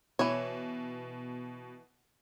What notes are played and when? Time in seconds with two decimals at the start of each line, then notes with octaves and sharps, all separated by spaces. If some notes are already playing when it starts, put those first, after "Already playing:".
0.19 B2 E3 C#5